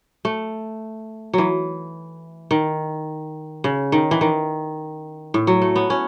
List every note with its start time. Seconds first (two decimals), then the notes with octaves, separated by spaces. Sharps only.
0.25 A3
1.34 E3 F#3
2.51 D#3
3.64 C#3
3.92 D#3
4.11 E3
4.21 D#3
5.34 A2
5.47 F#3
5.62 A3
5.76 B3
5.90 C#4